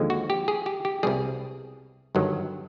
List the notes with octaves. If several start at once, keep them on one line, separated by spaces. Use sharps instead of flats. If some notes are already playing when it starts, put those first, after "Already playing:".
Already playing: D#2 D3 F3 G#3
F#4
G4
G#4
G4
G4
C2 B2 G3 G#4
G1 G2 D#3 F#3